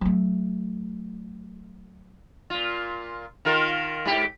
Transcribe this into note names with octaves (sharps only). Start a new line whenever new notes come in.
F#3 A3
A#2 F4
D#3 F4 A#4
G#2 G4